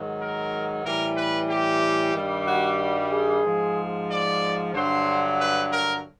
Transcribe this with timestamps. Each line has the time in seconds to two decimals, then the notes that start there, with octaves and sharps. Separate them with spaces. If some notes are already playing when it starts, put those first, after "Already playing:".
Already playing: G#2 D#3 F#3
0.19 A#4
0.84 A2 E3 G3 A#4
1.16 B4
1.49 G4
2.14 G2 D#3 G3
2.47 F#4
2.79 F#4
3.11 G#4
3.43 G#2 F3
4.09 D5
4.73 G2 D3 F#3 C5
5.39 B4
5.70 A#4